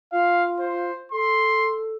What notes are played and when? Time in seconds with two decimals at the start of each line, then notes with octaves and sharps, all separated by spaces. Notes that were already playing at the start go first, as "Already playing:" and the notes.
0.12 F4 F5
0.60 C5
1.12 A4 C6